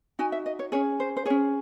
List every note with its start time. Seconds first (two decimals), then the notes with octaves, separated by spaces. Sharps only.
0.19 D#4 F#4 G#5
0.32 E5
0.46 D#5
0.59 C#5
0.72 C#4 G#4 C#5
1.00 C5
1.17 C5
1.25 G#4 C#5
1.30 C#4